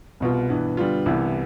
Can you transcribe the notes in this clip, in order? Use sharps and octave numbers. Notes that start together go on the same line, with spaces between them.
C2 B2 B3 F4
G2 E3 B3
D3 G3 B3 F4
C2 C3 E3 B3